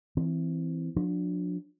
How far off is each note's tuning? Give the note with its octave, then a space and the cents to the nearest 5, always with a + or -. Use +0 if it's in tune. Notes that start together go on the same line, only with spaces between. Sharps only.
E3 +0 C4 -10
F3 +45 D4 +0